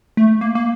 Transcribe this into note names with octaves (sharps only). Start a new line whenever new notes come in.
A3
A#3
A#3